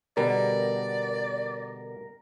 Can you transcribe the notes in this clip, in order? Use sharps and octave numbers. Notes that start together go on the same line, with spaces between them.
B2 D3 G3 A#4 D5